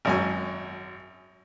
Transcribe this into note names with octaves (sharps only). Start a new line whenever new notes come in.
G#1 F#2 G#5